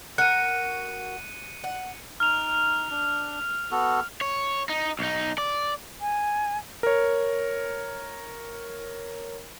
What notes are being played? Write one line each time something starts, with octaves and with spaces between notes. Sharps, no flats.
F#4 A#4 F#6 C#7 D#7
F#5
D#4 F6 F7
D4
B3 F#4 A4
C#5
D#4
B1 D#4
D5
G#5
A#4 C#5